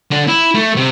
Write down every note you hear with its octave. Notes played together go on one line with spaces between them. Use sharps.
D3
E4
A3
C3